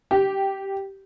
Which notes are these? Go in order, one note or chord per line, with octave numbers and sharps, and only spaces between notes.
G4